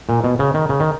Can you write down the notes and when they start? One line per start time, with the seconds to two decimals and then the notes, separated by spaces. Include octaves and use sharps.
0.09 A#2
0.24 B2
0.39 C#3
0.54 D#3
0.69 C#3
0.80 D#3